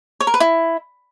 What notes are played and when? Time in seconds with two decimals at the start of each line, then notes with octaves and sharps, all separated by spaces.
0.20 C#5
0.27 A#4
0.34 B4
0.40 E4